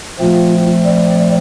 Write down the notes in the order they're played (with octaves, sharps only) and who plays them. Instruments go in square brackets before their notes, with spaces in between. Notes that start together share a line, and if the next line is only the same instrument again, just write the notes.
[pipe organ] A#2 F3 A3 C4 [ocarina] F4
[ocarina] D5